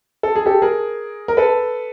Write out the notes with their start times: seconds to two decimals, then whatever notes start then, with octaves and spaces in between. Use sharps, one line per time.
0.23 A4
0.36 G#4
0.46 G4 A4
0.62 G#4 A#4
1.28 A#4
1.37 A4 B4